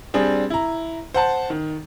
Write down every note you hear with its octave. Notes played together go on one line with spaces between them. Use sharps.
G3 C4 D4 G#4
E4 A#5
C5 F#5 A5
D#3